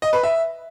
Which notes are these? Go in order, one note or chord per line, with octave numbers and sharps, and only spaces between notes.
D#5
B4
E5